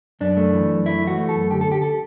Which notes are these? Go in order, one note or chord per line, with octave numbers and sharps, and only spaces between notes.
F#2 D4
A3
E3
F#2
A3 E4
E3
F#4
A3
A4
F#2
D3 G4
A4
D2 G4
A4